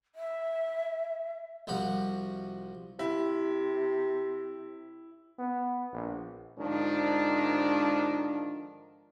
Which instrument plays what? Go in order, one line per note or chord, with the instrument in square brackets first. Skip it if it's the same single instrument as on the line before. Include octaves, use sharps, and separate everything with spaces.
[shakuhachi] E5
[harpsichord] C2 F3 F#4
[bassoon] C3 [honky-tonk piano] E4
[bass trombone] B3
A#1
[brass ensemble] G#2 D3 D#3 F3 D4